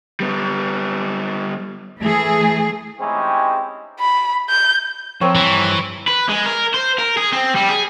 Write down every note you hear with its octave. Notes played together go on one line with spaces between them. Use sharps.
G3 B3
E3 A3 G#4
G#3 C4 C#4 D#4 E4 G4
B5
G6
F3 C4 A#4 C#5
G2 E3 A#5
B4
G#3
A#4
C5
A#4
G#4
C4
G3
G#4